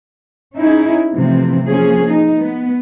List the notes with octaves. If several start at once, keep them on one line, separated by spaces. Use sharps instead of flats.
C#4 D#4 E4 G#4
C3 E3 F3 A3 C4
F3 A#3 C#4 G#4
D#4
B3